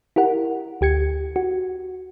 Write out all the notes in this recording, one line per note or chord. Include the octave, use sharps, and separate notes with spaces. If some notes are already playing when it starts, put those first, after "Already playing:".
E4 G4 A#4 F#5
D2 G4 G#6 C#7
F#4